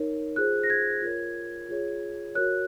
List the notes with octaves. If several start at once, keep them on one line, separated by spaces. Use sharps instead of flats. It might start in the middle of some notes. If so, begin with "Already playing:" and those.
Already playing: D#4 A#4 C#5
F4 G#4 C5 F#6
A#6
G#6
F4 A#4 C#5
F4 G#4 C#5
F#4 A#4 C#5 F#6